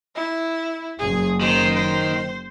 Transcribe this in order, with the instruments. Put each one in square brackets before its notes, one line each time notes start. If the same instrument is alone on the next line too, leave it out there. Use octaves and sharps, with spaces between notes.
[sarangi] E4
[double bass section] F#1 [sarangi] G#4
[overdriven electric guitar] D#3 [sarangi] C5
[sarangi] C5